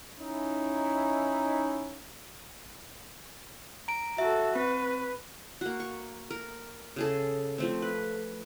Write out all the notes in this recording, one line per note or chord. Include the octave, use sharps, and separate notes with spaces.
C#4 D#4 E4
A#5 D7
F#4 A4 E5
C4 B4
A#3 F#4
C#6
A#4
C#3 G#4 A4
F3 A3 C4
B4